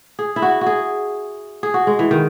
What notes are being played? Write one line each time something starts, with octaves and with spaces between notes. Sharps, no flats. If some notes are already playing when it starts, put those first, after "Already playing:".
G#4
E4
F#4
F#4
G#4
G#4
F#4
G#3
E3
D#3